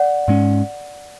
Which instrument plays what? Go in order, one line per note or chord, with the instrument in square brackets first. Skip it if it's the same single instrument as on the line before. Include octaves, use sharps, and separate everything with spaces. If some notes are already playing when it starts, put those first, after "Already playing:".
Already playing: [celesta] D5 F#5
[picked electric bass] G#2 G#3 C#4